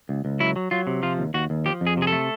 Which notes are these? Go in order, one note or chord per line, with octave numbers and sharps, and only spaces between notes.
C#2
C#2
F#3 E4
F#3
F#3 F4
C3
F3 F4
D#2
D#2 F#4
D#2
F3 G4
F2
G#4
C3 G#4
A4
A3